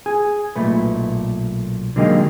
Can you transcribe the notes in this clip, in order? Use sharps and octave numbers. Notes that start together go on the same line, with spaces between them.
G#4
B1 A#2 A3 B4
D3 F#3 G#3 A#3 D#4 G4